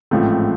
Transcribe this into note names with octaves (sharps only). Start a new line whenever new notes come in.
A1 G#2 F3 A3 C4